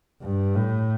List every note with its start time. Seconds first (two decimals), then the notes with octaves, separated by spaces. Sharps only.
0.22 G2
0.55 A2